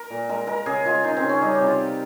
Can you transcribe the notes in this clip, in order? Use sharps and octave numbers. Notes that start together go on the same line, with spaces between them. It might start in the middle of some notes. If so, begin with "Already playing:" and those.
Already playing: A#4
A#2
G#3 A#4
G#3 A#4
C#3 G#4
G#3 F4
C#3 D#4
C4
C#3
C#4
G3 D#4
G4
C3
F4
C3